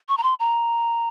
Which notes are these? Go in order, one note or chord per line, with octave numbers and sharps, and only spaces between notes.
C#6
A#5
C6
A#5